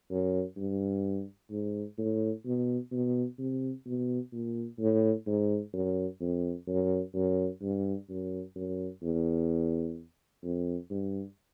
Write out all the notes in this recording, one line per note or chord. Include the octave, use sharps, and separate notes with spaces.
F#2
G2
G#2
A2
B2
B2
C3
B2
A#2
A2
G#2
F#2
F2
F#2
F#2
G2
F#2
F#2
E2
F2
G2